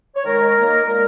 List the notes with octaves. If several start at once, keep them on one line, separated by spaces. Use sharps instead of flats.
C#5
D#3 G#3 A#4
D#3 A#3
A#2 G#3 A#4